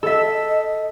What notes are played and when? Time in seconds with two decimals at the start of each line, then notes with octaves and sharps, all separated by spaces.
0.03 A4 D#5 E5